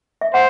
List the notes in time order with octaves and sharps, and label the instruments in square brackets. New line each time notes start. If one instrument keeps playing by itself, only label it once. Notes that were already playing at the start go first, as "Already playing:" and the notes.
[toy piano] E5
[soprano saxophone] C5 [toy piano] F#5